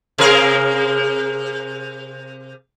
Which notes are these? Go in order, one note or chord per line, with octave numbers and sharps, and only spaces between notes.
C3 G#4 A#4